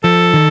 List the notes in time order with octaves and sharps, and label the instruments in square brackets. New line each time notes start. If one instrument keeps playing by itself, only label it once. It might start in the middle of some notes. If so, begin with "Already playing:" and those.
[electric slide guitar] F3 [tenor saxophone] A4
[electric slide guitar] D#3